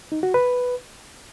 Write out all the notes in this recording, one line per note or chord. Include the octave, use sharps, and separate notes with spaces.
D#4
F#4
B4